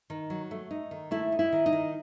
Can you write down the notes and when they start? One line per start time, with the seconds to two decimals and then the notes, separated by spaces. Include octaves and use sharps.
0.10 D#3
0.30 F#3
0.51 A3
0.71 D#4
0.91 D#3
1.11 A3 E4
1.32 D#4
1.39 E4
1.52 D#3
1.66 D#4
1.73 D#3